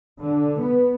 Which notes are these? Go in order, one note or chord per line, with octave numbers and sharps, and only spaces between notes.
D3
B3